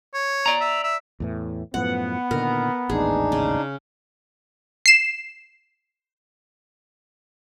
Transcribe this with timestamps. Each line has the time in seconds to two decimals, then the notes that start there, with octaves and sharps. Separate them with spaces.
0.14 C#5
0.46 D5 A#5
0.61 E5
0.83 E5
1.20 E2 A2 E3
1.74 F#2 A2 F3 B3 F#5
2.31 A#2 D3 D#3 A#4
2.90 A1 D#2 G#2 D4 D#4 G#4
3.32 C#3
4.86 C7 E7